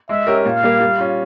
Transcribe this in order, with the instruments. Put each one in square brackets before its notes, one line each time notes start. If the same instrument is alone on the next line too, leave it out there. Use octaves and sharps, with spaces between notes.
[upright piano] G#3 [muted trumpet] E5
[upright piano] C#4 G4 A#4
[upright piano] A#2 [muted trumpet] F5
[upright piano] G3 A#3
G3
C#4 F4